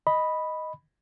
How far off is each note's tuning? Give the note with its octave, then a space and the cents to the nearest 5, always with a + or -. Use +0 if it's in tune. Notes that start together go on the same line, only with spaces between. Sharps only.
D#5 +0 B5 +0